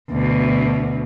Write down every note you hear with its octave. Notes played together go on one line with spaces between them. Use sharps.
D2 B2